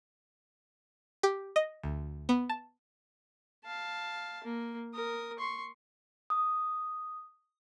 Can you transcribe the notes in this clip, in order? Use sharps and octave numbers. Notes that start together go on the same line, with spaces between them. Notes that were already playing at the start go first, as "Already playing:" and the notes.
G4
D#5
D2
B3
A5
F5 A5
A#3
A#4 D#6
C6 C#6
D#6